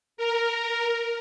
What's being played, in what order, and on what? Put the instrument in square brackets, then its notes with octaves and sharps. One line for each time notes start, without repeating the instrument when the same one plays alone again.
[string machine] A#4